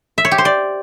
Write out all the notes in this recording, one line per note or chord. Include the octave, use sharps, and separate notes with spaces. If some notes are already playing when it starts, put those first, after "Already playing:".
E5
C#5
G4
C5
D5